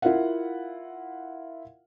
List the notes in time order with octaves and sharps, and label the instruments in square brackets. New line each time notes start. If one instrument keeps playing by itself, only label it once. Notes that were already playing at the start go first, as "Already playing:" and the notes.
[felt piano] E4 F4 A#4 F5 F#5